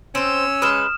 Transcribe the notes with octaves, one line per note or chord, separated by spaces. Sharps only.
C4 C#4 C5 E6
G#3 B4 D#6 F6 E7